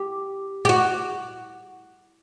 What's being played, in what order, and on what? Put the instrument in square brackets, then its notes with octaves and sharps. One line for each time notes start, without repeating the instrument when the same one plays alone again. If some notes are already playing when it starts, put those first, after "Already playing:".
Already playing: [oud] G4
G4
F#4